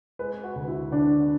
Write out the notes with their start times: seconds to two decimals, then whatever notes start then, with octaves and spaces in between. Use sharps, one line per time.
0.19 G#3 B4
0.44 F#4
0.56 D2
0.68 E4
0.91 D3 D4